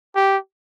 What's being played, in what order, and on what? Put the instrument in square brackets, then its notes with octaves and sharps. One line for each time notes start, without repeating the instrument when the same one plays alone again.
[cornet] G4